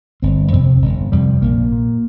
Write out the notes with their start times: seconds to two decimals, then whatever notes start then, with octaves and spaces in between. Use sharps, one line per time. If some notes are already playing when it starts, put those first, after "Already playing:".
0.22 G1 C4
0.53 F2 C3 C4
0.82 G1
1.12 F2 C3 G3
1.42 A#1 A#3
1.72 A#2